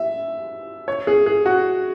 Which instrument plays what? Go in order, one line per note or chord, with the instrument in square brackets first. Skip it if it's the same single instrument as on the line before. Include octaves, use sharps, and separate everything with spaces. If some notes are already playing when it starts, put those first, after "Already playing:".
Already playing: [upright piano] E5
C#5
G#4
G#4
F#4